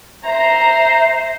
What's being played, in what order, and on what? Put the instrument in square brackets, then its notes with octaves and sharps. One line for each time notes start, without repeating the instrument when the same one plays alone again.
[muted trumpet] C5 [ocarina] E5 [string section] A#5